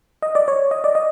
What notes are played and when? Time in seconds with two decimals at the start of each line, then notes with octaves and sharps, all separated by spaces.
0.22 D#5
0.35 D5
0.48 C#5
0.71 D#5
0.84 D5
0.95 D#5